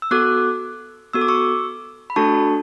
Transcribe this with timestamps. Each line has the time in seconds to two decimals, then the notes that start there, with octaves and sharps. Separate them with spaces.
0.02 E6
0.11 B3 F#4 A4 D6 F#6
1.13 B3 F#4 A4 E6
1.21 D6
1.28 C#6 E6
2.10 B5
2.16 A3 D4 F#4 A4 A5 C#6